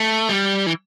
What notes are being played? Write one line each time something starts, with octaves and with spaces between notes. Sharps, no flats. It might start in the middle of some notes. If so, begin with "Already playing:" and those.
Already playing: A3
G3
E3